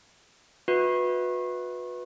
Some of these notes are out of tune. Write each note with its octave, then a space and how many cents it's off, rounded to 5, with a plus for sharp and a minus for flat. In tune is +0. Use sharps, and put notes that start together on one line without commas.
F#4 -35 B4 +0 E5 -35